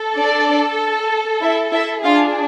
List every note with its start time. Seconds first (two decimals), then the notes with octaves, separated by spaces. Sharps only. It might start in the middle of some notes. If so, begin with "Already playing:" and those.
Already playing: A4
0.17 D4 D5
1.42 E4 E5
1.72 E4 E5
2.04 D4 F4 G#4 F5